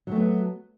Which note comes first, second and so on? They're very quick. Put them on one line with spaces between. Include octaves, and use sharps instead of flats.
F#3 A3 B3